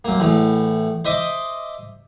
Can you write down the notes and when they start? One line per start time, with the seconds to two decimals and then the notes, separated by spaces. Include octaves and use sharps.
0.05 F#2 A#3
0.20 E2 A2
1.05 C5 D#5 E5 C6 D6